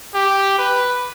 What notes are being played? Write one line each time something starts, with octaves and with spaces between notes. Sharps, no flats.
G4
B4